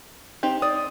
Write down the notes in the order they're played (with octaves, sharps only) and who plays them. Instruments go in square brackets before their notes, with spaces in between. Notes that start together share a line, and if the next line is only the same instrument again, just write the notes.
[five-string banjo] C4 D#4 G4
[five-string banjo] D5 [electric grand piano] D#6